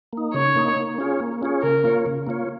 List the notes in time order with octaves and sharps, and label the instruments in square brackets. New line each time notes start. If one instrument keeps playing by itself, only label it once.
[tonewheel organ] A#3 D#4
[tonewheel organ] C#3 [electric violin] C#5
[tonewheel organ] A#3 D#4
A#3
C#4 F4 G#4 C#5
A#3
C#4 F4 G#4 C#5
[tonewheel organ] C#3 [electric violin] A#4
[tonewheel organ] A#3 F4 C#5
C#3
A#3 F4 C#5